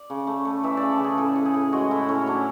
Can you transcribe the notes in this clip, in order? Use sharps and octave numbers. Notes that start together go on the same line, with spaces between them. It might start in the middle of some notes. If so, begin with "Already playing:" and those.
Already playing: D5
C#3
A3
A3
E3 E5
C#3 D5
A4
C#3 G#4
A2 A4
A2
G#4
A2
G#3 F#4
A2 E4
A2 C#4
F#3 D4